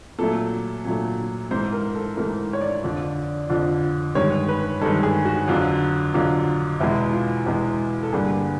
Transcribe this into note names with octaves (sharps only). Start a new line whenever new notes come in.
A#2 F#3 A3 A4
A#2 F#3 A3
G#2 E3 A3 C5
A#4
A4
G#2 E3 A3 A#4
C#5
D5
F2 D3 F3
F2 D3 F3
G2 D#3 G#3 C#5
B4
G2 D#3 G#3 A4
G#4
F#4
F2 D3 F#3 F4
F2 D3 F#3 F4
E2 B2 G#3 E4
F4
E2 B2 G#3
A4
G2 D3 G3 A#3 G#4